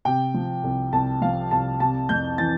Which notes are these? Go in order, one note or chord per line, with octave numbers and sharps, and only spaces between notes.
C3 G5
F3
C2
C2 A5
F3 F5
C2 A5
C3 A5
F2 G6
E3 A6